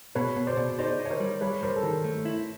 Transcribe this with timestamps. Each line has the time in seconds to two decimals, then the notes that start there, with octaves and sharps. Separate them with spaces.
0.15 B2 B4 C#5
0.36 B2
0.47 C5 D5
0.57 B2
0.78 D#4 C5 D5
1.00 D#4
1.05 C#5
1.10 A#4 C5
1.20 G3
1.41 G3 B4 C#5
1.62 G3 A#4 C5
1.76 A4
1.83 D#3 A#4
2.04 A3
2.25 E4